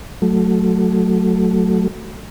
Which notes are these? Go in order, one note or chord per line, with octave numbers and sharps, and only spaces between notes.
F#3 A3